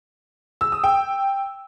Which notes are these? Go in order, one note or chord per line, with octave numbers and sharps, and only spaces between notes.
E6
D#6
G5